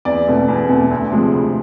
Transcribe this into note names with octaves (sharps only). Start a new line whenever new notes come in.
E2 D5
B2 A3
E2
B2 A3
D2
C3 F3 G#3
D2